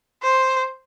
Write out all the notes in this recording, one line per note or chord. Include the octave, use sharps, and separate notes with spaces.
C5